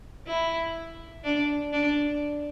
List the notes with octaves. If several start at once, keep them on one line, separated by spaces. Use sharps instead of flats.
E4
D4
D4